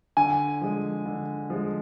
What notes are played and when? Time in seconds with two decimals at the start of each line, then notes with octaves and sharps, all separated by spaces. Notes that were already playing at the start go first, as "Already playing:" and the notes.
0.17 D3 G#5
0.61 F3 G#3
1.05 D3
1.50 F3 G#3